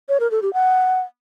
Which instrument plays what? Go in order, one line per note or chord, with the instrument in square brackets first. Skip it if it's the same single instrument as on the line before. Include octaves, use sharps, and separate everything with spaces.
[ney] C#5
A#4
A4
G4
F#5